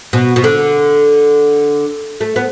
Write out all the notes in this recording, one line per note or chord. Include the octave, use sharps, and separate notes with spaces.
B2
B2
D3
A3
B3